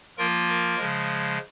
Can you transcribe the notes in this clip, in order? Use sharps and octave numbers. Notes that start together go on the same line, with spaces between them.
F3 A#3 F4 A#4
A#4
C#3 F3 G#3